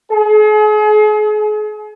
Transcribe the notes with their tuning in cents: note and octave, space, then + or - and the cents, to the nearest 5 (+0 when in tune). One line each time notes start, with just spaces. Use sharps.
G#4 +40